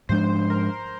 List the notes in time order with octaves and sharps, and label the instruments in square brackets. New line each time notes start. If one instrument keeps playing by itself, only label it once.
[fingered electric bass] G#2 F3 G#3 D4 [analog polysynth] C5
[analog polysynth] A#4